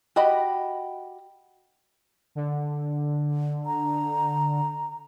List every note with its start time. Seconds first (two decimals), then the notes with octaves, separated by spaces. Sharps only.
0.16 F#4 G4 D#5 B5
2.35 D3
3.66 A#5